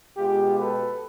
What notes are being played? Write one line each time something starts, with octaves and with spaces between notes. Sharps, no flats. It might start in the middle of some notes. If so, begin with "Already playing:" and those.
B2 G#3 F4 G4
A4 B4